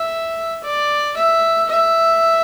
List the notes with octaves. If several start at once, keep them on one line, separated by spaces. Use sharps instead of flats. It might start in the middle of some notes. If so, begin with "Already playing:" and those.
Already playing: E5
D5
E5
E5